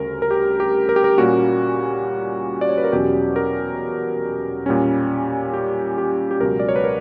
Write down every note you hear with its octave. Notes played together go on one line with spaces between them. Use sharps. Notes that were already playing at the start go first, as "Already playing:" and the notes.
Already playing: D2 C#3 G3 C#4 A#4
A#4
G4
G4
A#4
G4
A#4
A#2 G3 A#3 C#4 F#4
D5
C#5
B4
A#4
E2 B2 F#3 C#4 G4
A#4
A#2 G3 C#4
G4
G4
G4
C#2 B2 F#3 A#4
D5
C#5
B4
A#4